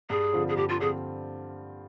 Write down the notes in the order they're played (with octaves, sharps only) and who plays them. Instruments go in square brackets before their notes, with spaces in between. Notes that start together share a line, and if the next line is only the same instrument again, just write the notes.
[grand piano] G2 [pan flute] G#4
[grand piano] D3 F3 C4 F4
[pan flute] G#4
[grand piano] G2 [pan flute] G4
[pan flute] F4
[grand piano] D3 F3 C4 F4 [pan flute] G#4